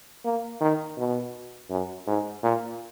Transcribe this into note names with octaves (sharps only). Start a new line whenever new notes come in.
A#3
D#3
B2
F#2
G#2
A#2